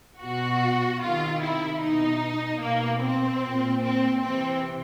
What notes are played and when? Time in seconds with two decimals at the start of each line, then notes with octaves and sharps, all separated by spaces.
0.21 B2 F#4
1.01 C3 D#3 F4
1.42 E4
1.81 B2 D#4
2.61 B2 A#3
3.02 C4
3.42 A#2
3.82 C4
4.22 C3 E3 C4